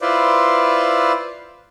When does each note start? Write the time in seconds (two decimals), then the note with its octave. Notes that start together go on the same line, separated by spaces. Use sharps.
0.01 E4 F4 B4 C5 D5